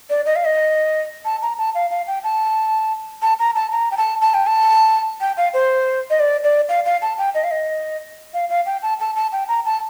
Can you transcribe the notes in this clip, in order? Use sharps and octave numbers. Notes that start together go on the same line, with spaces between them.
D5
D#5
F5
D#5
A5
A#5
A5
F5
F5
G5
A5
A5
A#5
A5
A#5
G5
A5
A5
G5
A5
G5
F5
C5
D#5
D5
D5
F5
F5
A5
G5
D#5
F5
D#5
F5
F5
G5
A5
A5
A5
G5
A#5
A5